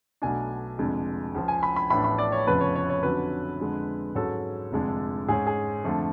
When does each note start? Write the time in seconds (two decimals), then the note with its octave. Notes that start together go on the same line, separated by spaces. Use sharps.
0.22 B1 B2 A3 D4 G#5
0.78 F1 F2 D3 G#3 D4
1.34 C#2 C#3 F3
1.48 G#5
1.63 B5
1.76 B5
1.90 A1 A2 F3 B3 D4 B5
2.04 B5
2.18 D5
2.32 C#5
2.47 F1 F2 C#3 F3 B3 B4
2.61 C#5
2.76 C#5
2.90 C#5
3.03 F2 D3 F#3 C#4 B4
3.59 F2 D3 G#3
4.15 G#2 F#3 C#4 A4
4.72 F1 F2 D3 G#3 D4
5.28 G#2 G#3 C#4 G#4
5.47 G#4
5.84 F2 D3 F3 A3